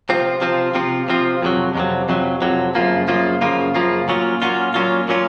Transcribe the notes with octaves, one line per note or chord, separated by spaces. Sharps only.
C3 F3 C4 F4
C3 F3 C4 F4
C3 F3 C4 F4
C3 F3 C4 F4
F2 C3 F#3
F2 C3 F#3
F2 C3 F#3
F2 C3 F#3
F#2 C#3 F3 A#3 F4
F#2 C#3 F3 A#3 F4
F#2 C#3 F3 A#3 F4
F#2 C#3 F3 A#3 F4
A#2 F#3 C#4 F4
A#2 F#3 C#4 F4
A#2 F#3 C#4 F4
A#2 F#3 C#4 F4